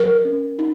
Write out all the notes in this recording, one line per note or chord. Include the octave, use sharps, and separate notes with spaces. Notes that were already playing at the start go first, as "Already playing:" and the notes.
Already playing: F#3 A#4
C#4
D#4